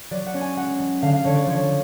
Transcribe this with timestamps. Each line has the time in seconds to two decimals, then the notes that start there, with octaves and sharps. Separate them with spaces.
0.11 F#3 D5
0.26 F#5
0.34 C#4
0.41 G#5
0.56 G#3 F#5
0.79 G#3
1.02 D3 F5
1.13 F5
1.25 D3 C#5
1.36 D5
1.47 F3 C#5